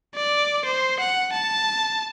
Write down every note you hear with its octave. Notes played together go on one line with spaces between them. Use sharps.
D5
C5
F#5
A5